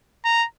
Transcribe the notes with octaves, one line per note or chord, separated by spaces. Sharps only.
A#5